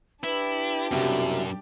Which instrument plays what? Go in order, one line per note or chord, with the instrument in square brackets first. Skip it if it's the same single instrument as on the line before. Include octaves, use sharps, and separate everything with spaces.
[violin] D4 G4 [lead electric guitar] E4 [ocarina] B4
[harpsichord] C2 B2 [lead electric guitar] F#2 [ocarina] E5